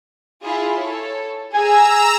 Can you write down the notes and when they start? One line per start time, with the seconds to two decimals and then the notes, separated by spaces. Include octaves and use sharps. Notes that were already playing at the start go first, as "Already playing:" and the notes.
0.43 E4 F4 G#4
0.80 A4 C#5
1.54 G#4 G#5 A#5 E6